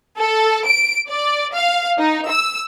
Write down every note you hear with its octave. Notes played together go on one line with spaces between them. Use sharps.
A4
D7
D5
F5
D#4
E6